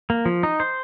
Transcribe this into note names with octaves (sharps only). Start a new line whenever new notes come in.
A#3
F3
D#4
C5